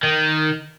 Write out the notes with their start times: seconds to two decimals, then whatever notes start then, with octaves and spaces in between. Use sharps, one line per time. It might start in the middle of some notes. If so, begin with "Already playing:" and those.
0.03 D#3